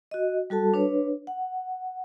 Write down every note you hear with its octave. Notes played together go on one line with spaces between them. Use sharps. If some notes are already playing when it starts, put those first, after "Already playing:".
F#4 D#5
G3 F#4 A4 A5
D4 B4 C#5
F#5